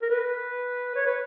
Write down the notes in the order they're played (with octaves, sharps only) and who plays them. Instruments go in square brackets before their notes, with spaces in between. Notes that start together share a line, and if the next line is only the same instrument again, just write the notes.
[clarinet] A#4
B4
C#5
B4